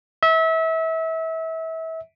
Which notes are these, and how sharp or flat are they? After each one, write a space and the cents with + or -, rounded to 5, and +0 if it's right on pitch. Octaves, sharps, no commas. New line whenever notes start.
E5 -30